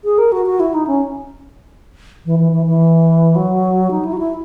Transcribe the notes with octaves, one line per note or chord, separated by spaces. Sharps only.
G#4
A#4
F#4
F#4
E4
D#4
C#4
E3
E3
E3
E3
F#3
D#4
E4
F#4
E4